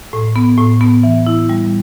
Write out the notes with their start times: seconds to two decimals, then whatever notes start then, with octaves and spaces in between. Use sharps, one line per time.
0.13 A2
0.36 B3
0.58 A2
0.81 B3
1.03 E3
1.27 E4
1.50 G3